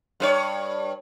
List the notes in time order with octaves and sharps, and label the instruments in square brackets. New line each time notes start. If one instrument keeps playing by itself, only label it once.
[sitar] G2 B4 C#5